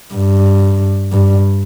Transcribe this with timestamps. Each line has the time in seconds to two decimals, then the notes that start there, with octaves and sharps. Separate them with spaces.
0.14 G2
1.13 G2